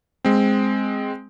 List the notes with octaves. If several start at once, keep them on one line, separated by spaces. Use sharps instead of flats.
G#3 C4